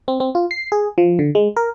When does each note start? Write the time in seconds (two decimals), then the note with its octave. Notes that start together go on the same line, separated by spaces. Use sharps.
0.08 C4
0.20 C4
0.35 F4
0.51 C7
0.72 G#4
0.98 F3
1.19 D3
1.35 G#3
1.57 A#4